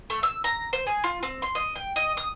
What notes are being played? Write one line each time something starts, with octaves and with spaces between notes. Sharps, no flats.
A3
E6
A#5
C5
G#4
F4
C4
C6
D#5
G5
D#5
D#6